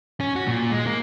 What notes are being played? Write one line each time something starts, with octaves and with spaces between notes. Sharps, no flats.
C#4
F#4
A#2
G#3
A#3